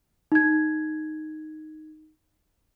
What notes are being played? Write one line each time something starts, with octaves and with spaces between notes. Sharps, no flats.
D#4 G#6